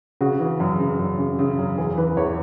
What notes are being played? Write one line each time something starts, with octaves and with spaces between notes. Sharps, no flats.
C#3 F#4
E3
F#2
C#3
F#2
C#3
C#3
F#2
E2 G#4
E3 B4
E2 C#5